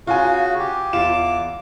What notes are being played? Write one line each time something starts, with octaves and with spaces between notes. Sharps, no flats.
C#3 F4 F#4 G#5
G4
E2 F4 D6 E7